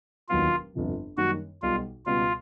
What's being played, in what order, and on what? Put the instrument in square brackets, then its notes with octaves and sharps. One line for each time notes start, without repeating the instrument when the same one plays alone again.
[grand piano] E1 D#2 D#3 F#3 B3 [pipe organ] F4
[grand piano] G1 F2 C3 F3
[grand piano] F#2 D#3 G3 A#3 D#4 [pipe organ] F#4
[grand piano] B1 B2 G3 [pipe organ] F4
[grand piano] C#2 B2 G3 B3 [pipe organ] F4